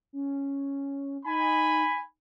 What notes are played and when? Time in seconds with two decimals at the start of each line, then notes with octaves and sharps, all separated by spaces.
0.13 C#4
1.25 D#4 G#5 B5